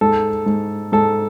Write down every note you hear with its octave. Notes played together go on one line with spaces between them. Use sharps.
G#2 A4
G#2
G#2 A4